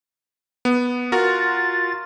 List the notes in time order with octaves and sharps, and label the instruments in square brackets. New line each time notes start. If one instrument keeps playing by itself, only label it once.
[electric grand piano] B3
[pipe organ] F4 A6 [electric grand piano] F#4 A#4